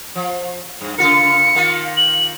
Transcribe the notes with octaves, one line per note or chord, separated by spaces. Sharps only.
F3
G2
C#3 F4 A#4 C#7
D#3 A#3 F4
F#7